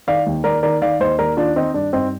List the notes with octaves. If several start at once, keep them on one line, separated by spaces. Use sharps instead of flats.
D#3 D5 F5
D#2
D#2 A#4 D5
D#3 A#4 D5
D#3 D5 F5
D#2 C5 D#5
D#2 A#4 D5
D#3 D4 F4
D#3 C4 D#4
G2 D4
G2 C4 D#4